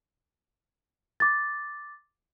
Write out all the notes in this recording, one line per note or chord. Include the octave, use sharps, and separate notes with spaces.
D6 A6